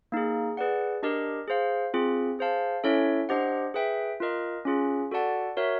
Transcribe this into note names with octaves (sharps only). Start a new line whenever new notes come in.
A#3 D#4 G#4
G#4 B4 D5 F#5
D4 G4 A#4 D#5
G#4 C5 F5
C4 F4 G#4
G#4 C5 F5 A5
C#4 E4 A4 C#5 E5
D4 G4 C5 D#5 F#5
G#4 B4 E5 G5
F4 A#4 D#5
C#4 F4 G#4
F#4 A4 D5 F#5 A5
F#4 A#4 C#5 E5